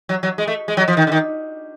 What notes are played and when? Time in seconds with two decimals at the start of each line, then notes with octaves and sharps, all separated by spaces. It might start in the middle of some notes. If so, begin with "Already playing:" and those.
0.09 F#3
0.23 F#3
0.38 G#3
0.47 A3
0.68 G#3
0.77 F#3
0.88 F3
0.97 D#3
1.07 D3
1.12 D#3